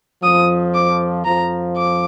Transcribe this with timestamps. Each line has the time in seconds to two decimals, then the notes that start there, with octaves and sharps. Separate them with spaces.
0.23 F2 F3 D#6
0.75 D6
1.25 F2 F3 A#5
1.77 D6